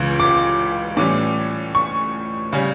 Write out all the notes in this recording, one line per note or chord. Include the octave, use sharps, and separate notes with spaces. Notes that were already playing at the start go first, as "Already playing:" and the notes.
Already playing: C#2 C#3 E3
D6
A2 E3 G3 C#4 D6
C#6
C#3 G3 C#4